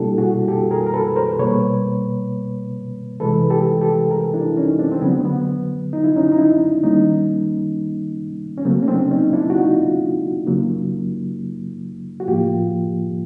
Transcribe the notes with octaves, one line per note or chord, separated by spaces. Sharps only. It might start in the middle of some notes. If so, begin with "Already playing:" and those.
Already playing: B2 G3 A#3 D4 E4 G4 A4
F#4 G#4
G4 A4
G#4 A#4
A#4
A4 B4
A#4 C5
B2 G3 A#3 B4 C#5
C3 E3 G#3 A4 B4
G4 A4
G4 A4
G#4 A#4
D4 E4
C#4 D#4
C4 D4
C4
D3 F#3 A3 B3
B3
D#4
E4
C#4 D#4
D#4
D4 E4
D#3 G3 A#3 C#4 D#4
C#4
C#3 F#3 A3 A#3 C4
C#4
C4 D4
C#4 D#4
D4 E4
F#4
D#4 F4
C#3 F#3 A#3
F#4
A2 F3 A#3 F4 G4